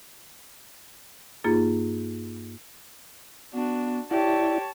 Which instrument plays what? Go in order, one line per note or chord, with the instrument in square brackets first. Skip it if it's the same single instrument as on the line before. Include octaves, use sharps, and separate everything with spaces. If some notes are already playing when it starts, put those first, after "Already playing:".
[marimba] G2 A#3 D#4 F4 G#4 A6
[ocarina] B3 [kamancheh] D4 F#4
[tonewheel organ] E4 [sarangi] G4 [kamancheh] C#5 A5 [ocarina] D5